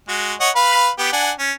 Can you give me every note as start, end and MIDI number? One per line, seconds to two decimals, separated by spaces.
0.09 0.34 56
0.09 0.34 66
0.40 0.50 73
0.40 0.50 75
0.40 0.50 78
0.56 0.89 71
0.56 0.89 77
0.56 0.89 83
0.99 1.13 59
0.99 1.13 67
1.13 1.31 62
1.13 1.31 78
1.13 1.31 80
1.39 1.52 61